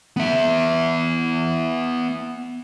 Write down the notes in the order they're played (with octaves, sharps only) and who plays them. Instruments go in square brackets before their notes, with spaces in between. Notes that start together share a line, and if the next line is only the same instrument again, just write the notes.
[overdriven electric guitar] B3 E5